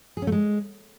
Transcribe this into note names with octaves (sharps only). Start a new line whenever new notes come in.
G#4
C#4
A3
G#3